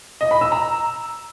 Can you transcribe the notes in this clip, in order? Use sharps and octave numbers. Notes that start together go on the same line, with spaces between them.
D#5
B5
E6
A#5